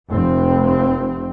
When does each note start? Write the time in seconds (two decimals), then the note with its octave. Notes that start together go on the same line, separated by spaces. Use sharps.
0.11 F1 C4